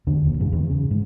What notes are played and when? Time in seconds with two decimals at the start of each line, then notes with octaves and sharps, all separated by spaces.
0.07 E2 D3 D4
0.25 E1 D#2
0.39 F2 G#2 C#3 E3
0.52 E2 C3 D#3
0.70 C#3
0.91 G#2